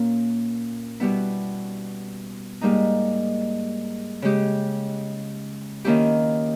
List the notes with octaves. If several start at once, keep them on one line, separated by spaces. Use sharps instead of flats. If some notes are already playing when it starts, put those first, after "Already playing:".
Already playing: A#2 A#3 C#4
B2 G3 B3 E4
G#2 G3 A#3 D#4
C#3 G#3 C#4 G4
D#3 A#3 C#4 E4 G4